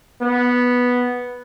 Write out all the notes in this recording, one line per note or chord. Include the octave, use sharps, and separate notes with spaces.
B3